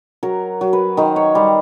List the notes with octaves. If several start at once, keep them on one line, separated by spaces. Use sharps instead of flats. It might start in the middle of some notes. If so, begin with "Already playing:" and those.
F#3 A#4
F#3
B4
D#3 C5
C#5
G3 C5